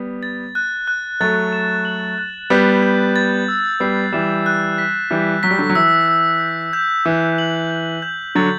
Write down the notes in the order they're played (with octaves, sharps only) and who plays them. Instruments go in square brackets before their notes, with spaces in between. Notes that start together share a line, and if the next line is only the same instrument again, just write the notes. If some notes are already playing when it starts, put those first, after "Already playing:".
Already playing: [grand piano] G3 B3
[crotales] A6
F#6
F#6
[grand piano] F#3 A3 [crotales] A6
[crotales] E7
F#7
F#6
[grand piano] G3 B3 [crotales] G6
[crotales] G6
A6
E6
[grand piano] G3 B3 [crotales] C7
[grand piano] E3 G3 [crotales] E7
[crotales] F#6
B6
[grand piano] E3 G3 [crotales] G6
[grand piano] F#3 [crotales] B6
[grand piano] G3
D3 F#3
F#3
[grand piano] E3 [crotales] E6
[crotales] E6
G6
G6
[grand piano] E3 [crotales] E6
[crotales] F#7
G6
G6
[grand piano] D3 F#3 [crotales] A6